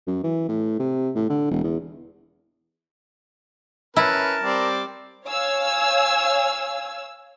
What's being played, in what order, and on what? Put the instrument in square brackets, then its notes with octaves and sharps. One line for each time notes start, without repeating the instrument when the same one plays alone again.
[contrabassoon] F#2
E3
A2
C3
A2
D3
E1
E2
[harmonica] C#4 B4 [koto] E4 [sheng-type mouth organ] A#4 A5
[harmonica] G3 C4 D5
[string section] C#5 F5 G#5 E6